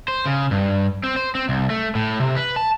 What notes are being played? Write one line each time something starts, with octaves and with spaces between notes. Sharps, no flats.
C5
C#3
G2
C4
C5
C4
C2
A3
A2
C3
B4
A5